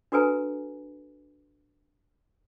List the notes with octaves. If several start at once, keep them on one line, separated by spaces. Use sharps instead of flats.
D4 F#4 A4 B4 G#5 A#5